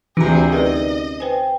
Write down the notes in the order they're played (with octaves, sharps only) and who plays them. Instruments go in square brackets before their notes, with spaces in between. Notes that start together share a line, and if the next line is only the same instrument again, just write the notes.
[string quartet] D2 C3 G#4 [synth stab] E3 A#5 [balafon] D4 F4 F#4
[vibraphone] C#4 D#4 D5 [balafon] G#4 A#4 B4 [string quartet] D#5
[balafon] B4 G#5 [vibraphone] C5 G5